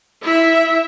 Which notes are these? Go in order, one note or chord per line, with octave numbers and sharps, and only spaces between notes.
E4 E5